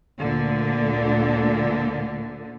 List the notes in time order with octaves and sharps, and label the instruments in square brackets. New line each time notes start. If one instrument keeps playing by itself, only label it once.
[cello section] D2 A#2 D3